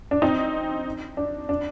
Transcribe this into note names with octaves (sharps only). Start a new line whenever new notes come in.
D4
C4 D#4
D4
D4